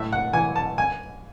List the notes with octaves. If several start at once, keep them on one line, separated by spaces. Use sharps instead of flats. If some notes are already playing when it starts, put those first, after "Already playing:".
Already playing: A2 E5
F#5
E3 G#5
A5
G#5